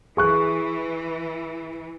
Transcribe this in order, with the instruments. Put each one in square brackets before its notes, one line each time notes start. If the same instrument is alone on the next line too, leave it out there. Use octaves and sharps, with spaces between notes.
[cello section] E3 [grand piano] G#4 C#6 F#6